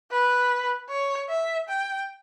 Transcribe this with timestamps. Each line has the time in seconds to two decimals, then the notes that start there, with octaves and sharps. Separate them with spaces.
0.11 B4
0.90 C#5
1.29 E5
1.69 G5